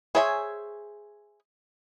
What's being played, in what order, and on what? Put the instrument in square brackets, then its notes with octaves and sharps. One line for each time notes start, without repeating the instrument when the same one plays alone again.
[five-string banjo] G#4 C5 C#5 E5 G#5